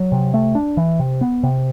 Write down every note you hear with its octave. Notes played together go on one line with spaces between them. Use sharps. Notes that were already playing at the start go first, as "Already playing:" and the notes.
Already playing: F#3
C3
A3
D4
E3
C3
B3
C3